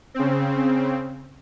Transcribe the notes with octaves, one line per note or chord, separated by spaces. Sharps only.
C#3 C4